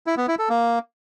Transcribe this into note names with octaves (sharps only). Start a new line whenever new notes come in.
E4
B3
E4
A4
A#3